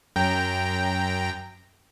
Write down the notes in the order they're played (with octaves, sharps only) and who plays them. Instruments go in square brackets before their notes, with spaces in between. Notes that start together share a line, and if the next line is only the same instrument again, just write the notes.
[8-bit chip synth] F#2 G5 A#5